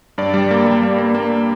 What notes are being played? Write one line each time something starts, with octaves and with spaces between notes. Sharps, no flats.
G2 D5
G3
A#3
G3
A#3
A#3
A#3